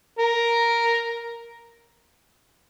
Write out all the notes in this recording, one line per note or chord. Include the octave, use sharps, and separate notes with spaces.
A#4